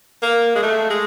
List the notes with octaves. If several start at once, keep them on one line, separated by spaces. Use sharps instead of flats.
A#3
G#3
A3
G#3